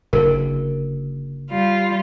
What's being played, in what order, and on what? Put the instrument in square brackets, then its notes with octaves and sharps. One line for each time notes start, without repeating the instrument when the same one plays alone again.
[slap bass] F#1 D3 [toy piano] A#4
[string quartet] G3 F4